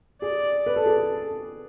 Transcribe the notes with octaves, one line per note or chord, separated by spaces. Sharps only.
G#4 D5
B4
A4
G#4
A4